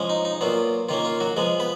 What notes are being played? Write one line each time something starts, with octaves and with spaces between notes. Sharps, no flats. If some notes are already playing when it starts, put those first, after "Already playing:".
Already playing: F3 G#3 C#4
D#4
D#4
A#2 F#3 B3 F4
D#3 A#3 C#4 F4
F4
F#3 F#4
F3 G#3 B3 G#4
B3 B4